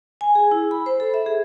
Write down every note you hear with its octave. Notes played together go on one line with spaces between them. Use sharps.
G#5
G#4
E4
B5
C5
A4
E5
G#4